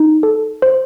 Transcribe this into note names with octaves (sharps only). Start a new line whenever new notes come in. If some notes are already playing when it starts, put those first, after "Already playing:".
Already playing: D#4
A4
C5